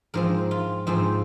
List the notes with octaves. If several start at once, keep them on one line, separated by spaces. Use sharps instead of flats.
G#2 F3 C4 A#4
F4
G#2 F3 C4 F4